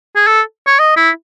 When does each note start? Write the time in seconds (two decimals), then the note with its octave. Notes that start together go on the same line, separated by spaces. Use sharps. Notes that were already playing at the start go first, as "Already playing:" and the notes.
0.16 G#4
0.27 A4
0.67 C#5
0.79 D#5
0.97 E4